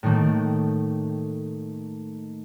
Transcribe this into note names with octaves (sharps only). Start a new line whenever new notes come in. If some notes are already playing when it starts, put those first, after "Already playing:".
A2 D#3 A3 A#3